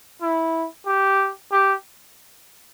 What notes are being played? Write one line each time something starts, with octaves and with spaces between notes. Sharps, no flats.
E4
G4
G4